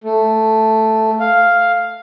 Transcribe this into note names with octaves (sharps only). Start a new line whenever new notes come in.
A3
F5